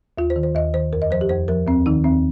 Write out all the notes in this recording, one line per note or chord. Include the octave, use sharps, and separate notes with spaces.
D#2 F4
C5
D#3
C5
D#2 D#5
D#3 C5
F2 A#4
D#5
F3 C5
G4
F2 C5
F3 A#4
D#2 C4
D#3 D#4
D#2 C4